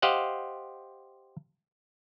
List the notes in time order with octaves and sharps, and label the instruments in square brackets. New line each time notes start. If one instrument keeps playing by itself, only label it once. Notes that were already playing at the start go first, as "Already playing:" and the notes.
[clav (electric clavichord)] G4 C5 D#5 F5 F#5